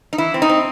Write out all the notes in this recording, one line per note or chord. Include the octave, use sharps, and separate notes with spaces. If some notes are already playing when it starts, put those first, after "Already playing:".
D#4
E3 E4
C4
D#4
C4